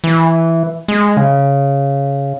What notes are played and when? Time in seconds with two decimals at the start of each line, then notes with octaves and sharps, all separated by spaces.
0.04 E3
0.88 G#3
1.17 C#3